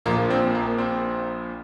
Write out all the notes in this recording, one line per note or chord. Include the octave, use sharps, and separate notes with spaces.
A#1 A#2 F3 A#3
C4
A#3
C4